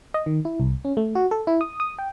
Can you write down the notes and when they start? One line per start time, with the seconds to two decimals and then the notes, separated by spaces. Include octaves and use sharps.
0.14 D#5
0.26 D#3
0.45 E4
0.60 C2
0.85 C#4
0.97 A3
1.15 F#4
1.31 A4
1.47 E4
1.61 D#6
1.80 D#6
1.99 G5